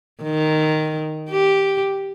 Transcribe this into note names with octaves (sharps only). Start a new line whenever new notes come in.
D#3
G4